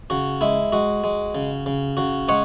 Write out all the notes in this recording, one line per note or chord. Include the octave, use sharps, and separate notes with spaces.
C#3 F#4
G#3 E4
G#3 F#4
G#3
C#3
C#3
C#3 F#4
G#3 C#5 F#5